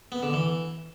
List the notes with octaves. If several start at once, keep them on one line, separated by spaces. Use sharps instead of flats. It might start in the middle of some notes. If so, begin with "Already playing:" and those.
B3
D3
E3